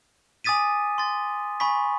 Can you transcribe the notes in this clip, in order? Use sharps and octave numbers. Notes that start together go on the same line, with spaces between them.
G#5 D6 D#6 A6 B6 D#7
C6 A6
G#5 B5 C#6 B6